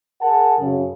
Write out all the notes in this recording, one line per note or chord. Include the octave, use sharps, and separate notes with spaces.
G#4 A#4 F#5 A5
F#2 C#3